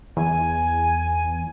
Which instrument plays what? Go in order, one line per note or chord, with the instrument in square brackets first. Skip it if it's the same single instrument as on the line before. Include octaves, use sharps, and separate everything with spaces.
[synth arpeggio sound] E2 [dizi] G#5